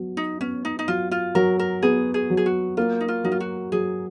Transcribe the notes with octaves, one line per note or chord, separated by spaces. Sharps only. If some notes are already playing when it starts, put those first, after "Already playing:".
Already playing: F#3 B3
D#4
B3 C#4
D#4
D#4
F#3 F4
F4
F#3 A#4
A#4
B3 G#4
G#4
F#3
G#4
F#4
A#3 F4
D#4
F4
F#3 D#4
F4
F#4
F#3 G#4